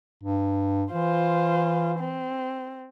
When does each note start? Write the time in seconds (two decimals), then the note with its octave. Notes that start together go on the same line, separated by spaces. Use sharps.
0.23 G2
0.92 E3 F4 C5
1.99 C4